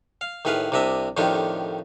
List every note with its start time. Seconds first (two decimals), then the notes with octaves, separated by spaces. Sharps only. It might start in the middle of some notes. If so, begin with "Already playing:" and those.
0.21 F5
0.45 D#2 A2 G#4 B4 F5
0.72 C2 C3 D4 D#5 E5
1.17 F2 A2 D#3 D4 F4 G4